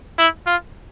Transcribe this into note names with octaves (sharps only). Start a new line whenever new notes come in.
E4
F4